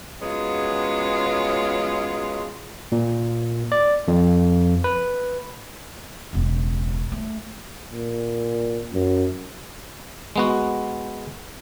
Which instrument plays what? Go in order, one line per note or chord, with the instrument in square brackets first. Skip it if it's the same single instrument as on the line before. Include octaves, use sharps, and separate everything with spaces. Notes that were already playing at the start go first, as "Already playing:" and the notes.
[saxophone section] F#3 G#3 B3 C#4 F4
[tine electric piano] A#2
D5
F2
B4
[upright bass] E1 C#2
A3
[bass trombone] A#2
F#2
[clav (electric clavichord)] G#3 B3 F#4